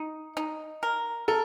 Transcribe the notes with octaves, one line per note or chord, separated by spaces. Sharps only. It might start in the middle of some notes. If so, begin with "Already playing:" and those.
Already playing: D#4
D#4
A#4
A4 A#4